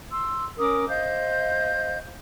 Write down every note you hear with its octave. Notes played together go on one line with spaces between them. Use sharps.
C6 E6
C#4 A#4 D6 D#6
C5 D#5 F5 G6